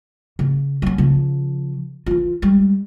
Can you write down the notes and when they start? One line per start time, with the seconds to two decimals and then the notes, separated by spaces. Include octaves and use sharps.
0.39 C#3
0.82 F#3 C#4
0.98 C#3 F3
2.06 E3 F4
2.42 G3 G#3